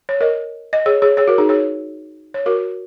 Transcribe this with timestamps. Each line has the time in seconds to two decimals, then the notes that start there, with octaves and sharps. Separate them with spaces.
0.09 C#5
0.21 A#4 D#5
0.73 D#5
0.86 G#4 C#5
1.02 G#4 C#5
1.17 G#4 C#5
1.28 F#4 A#4
1.38 D#4 G#4
1.49 G#4 C#5
2.34 C#5
2.46 F#4 A#4